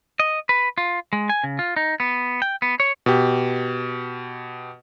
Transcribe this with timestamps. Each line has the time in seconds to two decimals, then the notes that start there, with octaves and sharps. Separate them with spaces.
0.20 D#5
0.49 B4
0.78 F4
1.13 G#3
1.29 G#5
1.44 C#3
1.59 F4
1.76 D#4
2.00 B3
2.42 G5
2.62 B3
2.80 C#5
3.06 B2 G4